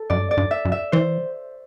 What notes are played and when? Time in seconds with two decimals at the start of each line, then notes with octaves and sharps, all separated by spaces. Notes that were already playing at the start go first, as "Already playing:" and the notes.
Already playing: A4
0.10 F#2 D5
0.17 G2
0.26 F#2
0.31 D5
0.37 G2
0.51 E5
0.65 F#2
0.72 E5
0.92 E3 C5